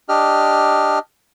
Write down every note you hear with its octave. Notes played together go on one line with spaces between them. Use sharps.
D4 G4 D#5 F6